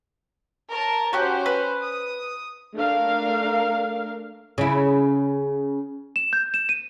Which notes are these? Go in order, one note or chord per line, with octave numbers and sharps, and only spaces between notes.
A#4 C#5 A5
C#4 F#4 G4 C5
B4
D#6
A3 D4 A#4 F5
C#3 E4
E7
G6
E7
D#7